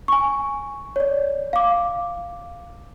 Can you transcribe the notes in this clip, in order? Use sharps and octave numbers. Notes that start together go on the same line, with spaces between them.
G#5 C#6
C#5 D5
F5 D6